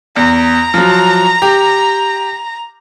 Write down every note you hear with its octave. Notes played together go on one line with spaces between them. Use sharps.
E2 A#5
F3 F#3
G4